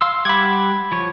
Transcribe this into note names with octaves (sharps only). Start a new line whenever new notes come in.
F5 C6 E6
G3 F#5 B5 D6 G#6
F3 C#5